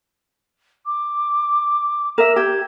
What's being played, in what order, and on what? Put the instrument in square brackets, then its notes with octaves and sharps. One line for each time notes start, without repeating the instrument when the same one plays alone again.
[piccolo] D6
[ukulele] A#4 E5 [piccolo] E7
[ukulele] G4 [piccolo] G#6